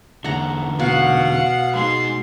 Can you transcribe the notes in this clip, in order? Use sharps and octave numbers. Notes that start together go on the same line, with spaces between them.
E2 D3 F#5 A#5
B2 F5 F#5
G#3 D#4 G#4 C6